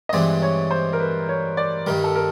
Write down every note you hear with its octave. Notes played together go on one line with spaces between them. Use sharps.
D#5
G2 E3 G#3 C4 D5
C#5
C5
A#4
B4
C#5
D5
G2 D#3 G3 A#4
A4
A#4